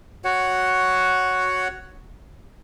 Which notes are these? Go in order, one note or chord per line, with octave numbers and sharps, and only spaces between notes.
F#4 C#5 F#5